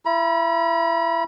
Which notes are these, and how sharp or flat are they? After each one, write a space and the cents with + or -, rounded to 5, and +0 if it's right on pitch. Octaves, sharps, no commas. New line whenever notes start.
E4 +30 B5 -40